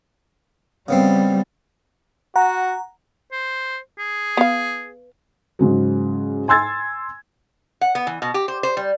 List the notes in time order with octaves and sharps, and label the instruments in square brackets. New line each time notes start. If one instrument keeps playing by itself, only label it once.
[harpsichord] C#3 B3 C4 [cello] G3
[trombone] F#4 [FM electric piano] F#5 A#5
[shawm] C5
G#4
[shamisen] B3 F5
[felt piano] G#2 C#3 F#3
G#5 C6 E6 G#6 A6
[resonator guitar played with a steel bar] F#5
B3
E3
B2
G4
C5
C5
G3